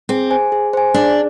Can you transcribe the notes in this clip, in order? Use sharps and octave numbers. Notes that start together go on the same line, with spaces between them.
C4 G#4
C5 G#5
G#4
C5 G#5
D4 G#4